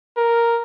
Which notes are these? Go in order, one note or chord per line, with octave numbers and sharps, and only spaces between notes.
A#4